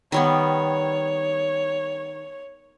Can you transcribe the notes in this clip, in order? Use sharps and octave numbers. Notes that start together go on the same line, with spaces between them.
D#3 G3 B3 C#5